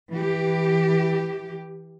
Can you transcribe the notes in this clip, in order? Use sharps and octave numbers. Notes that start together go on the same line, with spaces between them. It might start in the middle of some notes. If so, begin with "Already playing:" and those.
E3 G4